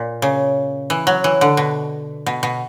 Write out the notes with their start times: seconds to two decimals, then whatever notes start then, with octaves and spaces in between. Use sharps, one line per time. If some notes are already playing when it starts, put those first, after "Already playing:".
Already playing: A#2
0.22 C#3
0.90 E3
1.07 F#3
1.24 E3
1.41 D3
1.57 B2
2.26 B2
2.43 B2